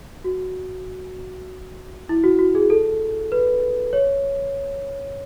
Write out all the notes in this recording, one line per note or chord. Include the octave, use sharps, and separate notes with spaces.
F#4
E4
F#4
F#4
G#4
A4
B4
C#5